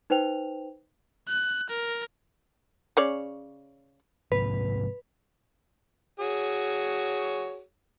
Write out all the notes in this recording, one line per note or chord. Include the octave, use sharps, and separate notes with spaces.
D#4 B4 C5 G5 F7
F#6
A#4
C#3 C#5 D5
G#2 C3 F3 B4
F#4 G#4 C#5